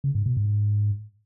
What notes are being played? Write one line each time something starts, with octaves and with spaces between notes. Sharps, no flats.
C#3
G#2
B2
G#2